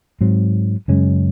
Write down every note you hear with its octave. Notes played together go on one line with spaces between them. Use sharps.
G#2 F#3 C4
F#2 C#3 G#3 C#4